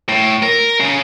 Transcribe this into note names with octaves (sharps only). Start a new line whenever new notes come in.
A2
A#4
C#3